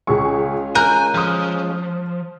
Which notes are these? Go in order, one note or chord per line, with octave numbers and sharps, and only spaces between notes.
C#2 G#3 C#4 F4 G#4 C#6
A#4 G#5 F#6 G6 D#7
F3 D#6 F6